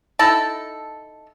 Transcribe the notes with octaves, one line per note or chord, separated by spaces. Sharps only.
D#4 E4 A4 A5